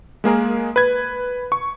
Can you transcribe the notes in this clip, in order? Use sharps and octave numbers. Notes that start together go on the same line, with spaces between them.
G#3 A#3 G#4 A#4
B4 G#6
C#6